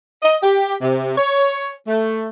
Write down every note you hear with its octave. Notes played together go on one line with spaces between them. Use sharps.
D#5
G4
C3
C#5
A3